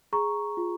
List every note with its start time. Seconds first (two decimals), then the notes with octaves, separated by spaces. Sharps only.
0.13 G#4 A#5 C#6
0.57 F4